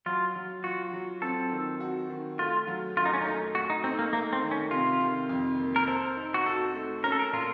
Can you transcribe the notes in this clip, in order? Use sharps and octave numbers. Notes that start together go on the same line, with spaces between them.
F#3 F4
F#3
F4 F#4
F#3
C4 A4
D#3
F#4
D#3
A3 F4
F#3
F#2 F4
D#4
C#4
A3 D#4
A3 F#4
D#4
C4 D#4
A#3
A3 A#3
C4
D#3
C#4
C3 F4
D#3
F2
A#3
A#4
A4 C5
D#4
F#4
F#4 A4
A3
C#4 A#4
A4
A#4
A#2 F4